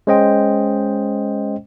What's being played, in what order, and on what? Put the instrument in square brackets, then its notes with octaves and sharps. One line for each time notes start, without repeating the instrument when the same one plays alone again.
[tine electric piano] G#3 C#4 C5 D#5 G5